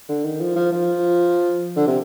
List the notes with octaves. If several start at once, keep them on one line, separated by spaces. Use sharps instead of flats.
D3
D#3
F3
F3
F3
D3
C3